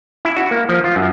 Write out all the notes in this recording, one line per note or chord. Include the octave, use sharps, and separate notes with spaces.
E4
F#4
A#3
F3
F4
F#2